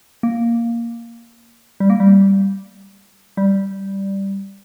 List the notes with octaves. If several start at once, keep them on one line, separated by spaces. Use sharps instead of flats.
A#3
G3
A#3
G3
G3